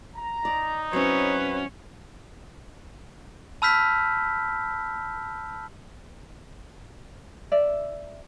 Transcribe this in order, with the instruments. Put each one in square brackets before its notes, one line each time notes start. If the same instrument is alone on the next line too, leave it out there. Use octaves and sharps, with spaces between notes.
[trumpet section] A#5
[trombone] D#4 [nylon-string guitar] D5
[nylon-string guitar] F#3 C4 E4 [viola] C#4 [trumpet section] B4
[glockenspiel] A5 B5 E6 F6 G6 B6
[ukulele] D5 E5